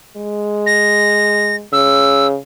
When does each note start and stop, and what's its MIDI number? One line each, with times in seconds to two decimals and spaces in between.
0.16 1.66 56
0.66 1.56 94
1.73 2.36 49
1.73 2.27 88